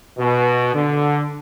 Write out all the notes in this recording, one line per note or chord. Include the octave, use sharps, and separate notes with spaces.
B2
D3